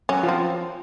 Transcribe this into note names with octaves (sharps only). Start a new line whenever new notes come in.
F#3 C#4 F#4
F3 F4
C4